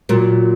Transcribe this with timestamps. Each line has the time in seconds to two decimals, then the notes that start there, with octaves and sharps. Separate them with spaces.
0.09 A#2 F#3